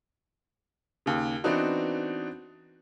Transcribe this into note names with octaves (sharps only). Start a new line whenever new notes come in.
D#2 C#3
E3 B3 C4 D4 D#4 F#4